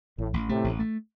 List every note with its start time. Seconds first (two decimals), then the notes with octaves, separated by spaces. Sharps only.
0.18 A1 A2
0.34 A1
0.49 A2 C3 A3
0.64 A1
0.79 A3